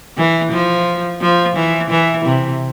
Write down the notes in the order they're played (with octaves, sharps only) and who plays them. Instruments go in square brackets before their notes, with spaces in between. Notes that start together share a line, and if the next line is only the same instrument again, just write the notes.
[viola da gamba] E3
F3
F3
E3
E3
C3